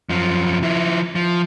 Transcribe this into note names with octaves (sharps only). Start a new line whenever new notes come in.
F#2 F3
F3 E4
F3